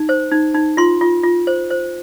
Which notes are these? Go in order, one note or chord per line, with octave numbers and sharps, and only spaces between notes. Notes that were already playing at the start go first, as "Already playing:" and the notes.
Already playing: D#4
C5
D#4
D#4
F4 C6
F4
F4
C5
C5